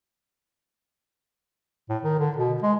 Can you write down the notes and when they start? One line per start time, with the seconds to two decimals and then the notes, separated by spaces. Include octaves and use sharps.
1.90 A2
2.03 D#3
2.19 D3
2.37 B2
2.63 G#3